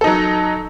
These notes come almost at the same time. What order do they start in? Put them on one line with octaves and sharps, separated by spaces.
A4 D#4 F#3